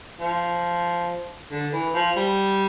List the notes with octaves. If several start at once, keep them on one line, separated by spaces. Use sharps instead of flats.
F3
D3
E3
F3
G3